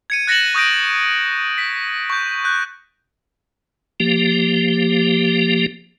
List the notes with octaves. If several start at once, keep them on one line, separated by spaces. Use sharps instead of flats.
G#6 C#7 D#7
F#6 A6 A#6 C#7 E7 F#7
C#6 D#6 G6 A#6 D7
B6
C#6 G6
F#6 G6
F3 A#3 G4